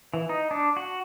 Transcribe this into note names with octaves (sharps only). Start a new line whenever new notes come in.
E3
D#4
D4
F#4